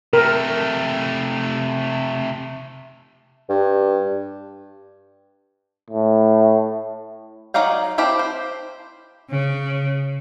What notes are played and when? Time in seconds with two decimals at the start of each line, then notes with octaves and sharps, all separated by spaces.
0.13 C3 A3 A#4
3.49 G2
5.90 A2
7.54 F#3 D#4 D5 F5 G5
7.98 C4 E4 G4 F5 A5
8.19 C5
9.29 C#3